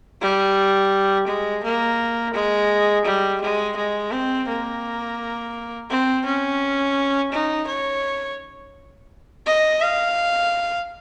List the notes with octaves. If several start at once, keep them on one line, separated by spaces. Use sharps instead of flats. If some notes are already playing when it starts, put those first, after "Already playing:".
G3
G#3
A#3
G#3
G3
G#3
G#3
C4
A#3
C4
C#4
D#4
C#5
D#5
F5